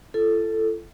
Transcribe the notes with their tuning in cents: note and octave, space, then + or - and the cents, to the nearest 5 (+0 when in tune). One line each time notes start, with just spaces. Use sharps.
F4 -40 A4 +0